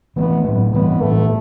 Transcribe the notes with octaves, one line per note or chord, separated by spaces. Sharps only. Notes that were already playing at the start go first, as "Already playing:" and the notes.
E3 A3 B3 C4
A2 F#3 A3
E3 G3 B3 C4
A2 E3 A3 B3